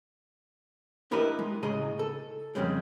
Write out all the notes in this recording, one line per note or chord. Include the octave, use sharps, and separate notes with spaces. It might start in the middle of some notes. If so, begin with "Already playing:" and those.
D4 E4 G4 A#4 B4 D#5
G#3
A2 C#3 G#4 D#5 A#5
A4
F2 G#2 C#3 G3 G#3